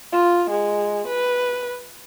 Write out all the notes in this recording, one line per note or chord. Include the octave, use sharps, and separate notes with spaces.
F4
G#3
B4